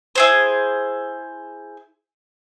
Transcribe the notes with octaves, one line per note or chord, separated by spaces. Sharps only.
E4 G#4 C5